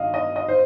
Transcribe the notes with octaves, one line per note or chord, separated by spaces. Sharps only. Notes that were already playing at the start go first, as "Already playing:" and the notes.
Already playing: G2 D#3 D#5 F5
D#5
D#5
C5